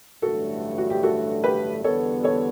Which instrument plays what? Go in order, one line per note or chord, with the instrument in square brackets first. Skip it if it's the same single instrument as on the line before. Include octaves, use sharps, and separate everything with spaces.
[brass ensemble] A1 G2 D3 F#3 A3 [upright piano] F#4 A4
[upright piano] F#4
G4
F#4 A4
G4 B4
[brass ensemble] E2 D3 G3 B3 [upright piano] A4 C#5
[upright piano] A4 C#5